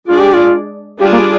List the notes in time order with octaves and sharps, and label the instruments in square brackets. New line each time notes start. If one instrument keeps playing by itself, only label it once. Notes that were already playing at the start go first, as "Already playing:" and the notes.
[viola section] G#3 D4 G#4 D5 [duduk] F4
[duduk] G4
F4
[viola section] G3 D4 F4 G#4 D5 [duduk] G4
[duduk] A#3